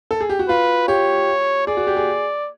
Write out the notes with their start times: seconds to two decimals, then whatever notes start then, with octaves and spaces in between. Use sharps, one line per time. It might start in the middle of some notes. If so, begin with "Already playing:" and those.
0.11 A4
0.21 G#4
0.29 G4
0.39 F#4
0.49 F4 B4
0.88 G4 C#5
1.67 G#4 D5
1.77 F#4
1.87 G4
1.97 G#4